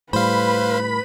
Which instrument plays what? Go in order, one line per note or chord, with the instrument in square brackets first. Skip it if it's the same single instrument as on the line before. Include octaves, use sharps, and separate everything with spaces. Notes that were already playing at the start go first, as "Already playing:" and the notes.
[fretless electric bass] A2 G3 [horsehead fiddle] B4 [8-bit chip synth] C5 F5 [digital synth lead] B5